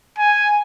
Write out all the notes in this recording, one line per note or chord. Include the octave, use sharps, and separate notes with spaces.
G#5